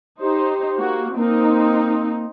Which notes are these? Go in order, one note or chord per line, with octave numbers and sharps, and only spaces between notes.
D#4 G4 C5
A#3 F#4
A#3 C4 D#4